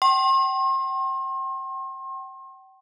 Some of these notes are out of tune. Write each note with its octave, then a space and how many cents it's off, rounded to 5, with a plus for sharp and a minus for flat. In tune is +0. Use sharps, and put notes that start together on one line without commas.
G5 -40 C6 +40